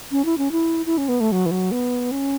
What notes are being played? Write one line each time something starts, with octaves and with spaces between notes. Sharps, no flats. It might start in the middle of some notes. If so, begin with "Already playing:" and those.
C#4
E4
C#4
E4
E4
C#4
B3
A3
F#3
E3
F#3
B3
C#4